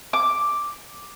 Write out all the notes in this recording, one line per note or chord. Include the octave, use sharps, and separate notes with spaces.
D6